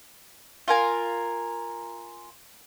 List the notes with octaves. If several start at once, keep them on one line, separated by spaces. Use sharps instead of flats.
F4 A#4 G#5